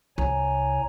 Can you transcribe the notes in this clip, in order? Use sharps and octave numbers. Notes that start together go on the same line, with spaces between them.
C2 C#5 G#5 A#5